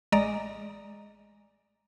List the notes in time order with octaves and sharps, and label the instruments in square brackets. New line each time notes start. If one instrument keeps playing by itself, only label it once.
[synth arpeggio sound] A1 G#3 D5 D#5 A#5